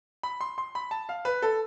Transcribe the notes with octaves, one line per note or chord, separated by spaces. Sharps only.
B5
C6
C6
B5
A5
F5
B4
A4